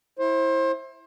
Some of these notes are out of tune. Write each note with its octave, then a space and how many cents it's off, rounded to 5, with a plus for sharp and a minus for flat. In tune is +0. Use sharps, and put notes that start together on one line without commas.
E4 -5 C5 +30